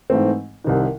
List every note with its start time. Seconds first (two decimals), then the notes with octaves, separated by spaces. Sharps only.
0.10 G#2 E3 A3 C4
0.64 C2 C3 D#3